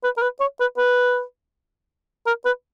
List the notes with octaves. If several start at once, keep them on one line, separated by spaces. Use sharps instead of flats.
B4
A#4
B4
C#5
B4
B4
A#4
B4